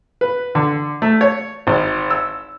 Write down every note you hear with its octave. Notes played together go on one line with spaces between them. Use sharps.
B4
D3
A3
C#5
G#1
E6